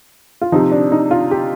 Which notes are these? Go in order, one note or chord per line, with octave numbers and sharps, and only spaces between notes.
F4
C3 F3 D#4
D4
D#4
F4
G4